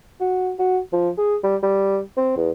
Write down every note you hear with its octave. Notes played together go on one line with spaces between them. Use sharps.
F#4
F#4
F3
G#4
G3
G3
C4
E2